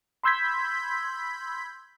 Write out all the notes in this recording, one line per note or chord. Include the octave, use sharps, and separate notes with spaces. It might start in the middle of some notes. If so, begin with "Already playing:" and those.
B5 C6 E6 G6 G#6 B6